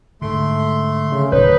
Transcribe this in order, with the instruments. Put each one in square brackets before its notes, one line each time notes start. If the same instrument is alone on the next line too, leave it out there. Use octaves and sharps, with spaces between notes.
[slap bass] G#2 D3 [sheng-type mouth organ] A3 C6
[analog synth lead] C#3
[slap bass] D1 [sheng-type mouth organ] D#4 [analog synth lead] B4 [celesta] C#5